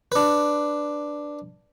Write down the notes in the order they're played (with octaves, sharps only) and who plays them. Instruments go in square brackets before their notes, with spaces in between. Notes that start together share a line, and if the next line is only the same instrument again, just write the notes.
[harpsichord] D4 B4